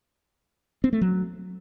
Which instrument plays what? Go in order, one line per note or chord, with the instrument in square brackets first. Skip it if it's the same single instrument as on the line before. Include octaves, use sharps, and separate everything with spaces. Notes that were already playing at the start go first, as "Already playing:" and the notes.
[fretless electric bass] C4
A3
F#3